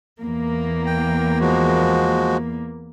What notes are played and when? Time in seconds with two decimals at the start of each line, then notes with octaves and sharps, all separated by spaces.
0.19 E2 A#3
0.86 G5
1.40 F3 G#3 F#4